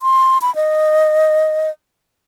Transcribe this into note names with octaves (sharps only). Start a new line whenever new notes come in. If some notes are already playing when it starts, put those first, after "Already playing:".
C6
B5
D#5